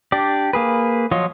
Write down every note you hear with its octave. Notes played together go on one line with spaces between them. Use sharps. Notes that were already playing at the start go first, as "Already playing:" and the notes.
D4 G4 D5
A#3 G#4 B4
F3 F#3 F4 C#5 D#5